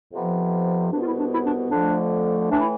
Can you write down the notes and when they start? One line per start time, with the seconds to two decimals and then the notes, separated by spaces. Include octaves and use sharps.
0.12 F2 C3 F3 B3
0.92 C2 B2 B3 D4
1.00 F4
1.05 E4
1.18 D4
1.32 E4
1.45 D4
1.71 F2 D3 F3 A3 D4
2.51 A2 E3 A3 D4
2.58 E4